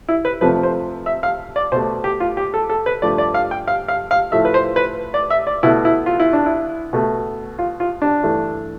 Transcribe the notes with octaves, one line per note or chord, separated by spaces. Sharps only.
E4
B4
F2 C3 F3 A3 B4
C5
E5
F5
D5
B2 A3 C5
G4
F4
G4
A4
A4
B4
G2 F3 A3 D5
D5
F5
G5
F5
F5
F5
A2 F3 A3 E5
B4
C5
B4
D5
E5
D5
B2 A3 E4
E4
F4
E4
D4
E4
B2 A3
F4
F4
D4
G2 E3 A3